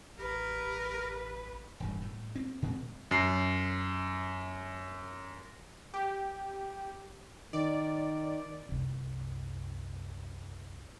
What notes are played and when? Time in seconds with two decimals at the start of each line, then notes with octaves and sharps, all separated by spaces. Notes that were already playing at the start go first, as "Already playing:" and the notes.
0.18 A1 G4 A#4 B4
1.80 E1 G2 A#2
2.01 A2
2.35 C4
2.62 A#2 G#3 C4
3.11 F#2 C7
5.94 G4
7.53 D#3 D5
8.69 C2 F#2